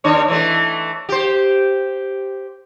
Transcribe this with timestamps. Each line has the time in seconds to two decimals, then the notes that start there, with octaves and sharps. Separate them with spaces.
0.04 D#2 D4 C#5
0.28 E3 A3
1.09 G4 C5